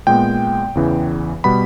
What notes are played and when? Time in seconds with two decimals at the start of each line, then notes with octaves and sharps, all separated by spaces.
0.07 A#2 G#3 B3 G5
0.75 E2 C#3 E3
1.44 B2 G3 B3 B5